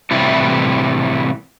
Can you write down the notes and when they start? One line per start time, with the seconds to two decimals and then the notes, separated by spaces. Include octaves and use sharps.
0.11 A2 C3 E3 G3 E4 F4